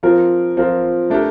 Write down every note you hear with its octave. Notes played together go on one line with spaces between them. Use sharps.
F3 C4 F4 A#4
F3 C4 F4 A#4
A3 D4 G4 A#4